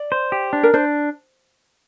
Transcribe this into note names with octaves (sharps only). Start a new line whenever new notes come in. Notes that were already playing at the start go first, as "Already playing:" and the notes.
Already playing: D5
C5
G4
D4
A#4
D4 C5